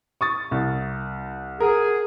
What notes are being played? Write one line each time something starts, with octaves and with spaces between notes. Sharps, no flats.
C#6 D#6 A6
C2
G#4 A#4 F#5